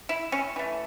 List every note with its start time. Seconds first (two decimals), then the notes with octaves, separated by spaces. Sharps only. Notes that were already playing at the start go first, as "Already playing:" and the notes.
0.09 E4
0.32 C#4
0.56 E3 A3